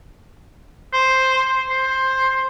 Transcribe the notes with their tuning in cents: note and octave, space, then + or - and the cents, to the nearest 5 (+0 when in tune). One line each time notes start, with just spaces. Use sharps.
C5 +0
C5 +10